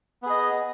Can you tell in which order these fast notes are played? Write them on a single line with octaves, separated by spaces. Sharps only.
B3 G#4 D#5